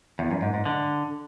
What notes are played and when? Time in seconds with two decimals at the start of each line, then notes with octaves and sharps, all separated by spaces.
0.19 E2
0.31 F#2
0.42 G#2
0.54 G#2
0.65 D3